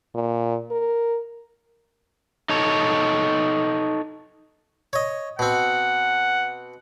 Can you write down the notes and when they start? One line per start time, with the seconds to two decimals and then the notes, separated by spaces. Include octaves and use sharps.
0.15 A#2
0.71 A#4
2.49 D#4 A4 C#5
4.93 C#5 D#5
5.39 B2 C4 F#5